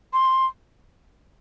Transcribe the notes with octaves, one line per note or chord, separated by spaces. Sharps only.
C6